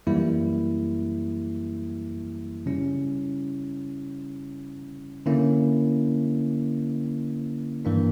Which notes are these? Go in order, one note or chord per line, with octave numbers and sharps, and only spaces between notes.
F#2 E3 G3 A#3 E4
C#3 G3 C#4 E4
D3 A#3 C#4 E4
G2 E3 A#3 D4